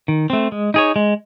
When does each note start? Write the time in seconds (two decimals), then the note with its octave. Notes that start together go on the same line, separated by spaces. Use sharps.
0.08 D#3
0.30 A3 C4
0.52 G#3
0.74 D#4 G#4 C#5
0.96 G#3